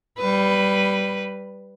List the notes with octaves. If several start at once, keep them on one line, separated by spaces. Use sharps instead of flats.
G3 B4